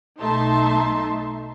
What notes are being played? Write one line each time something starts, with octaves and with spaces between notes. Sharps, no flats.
B1 A3 D#4 E5 A5 C6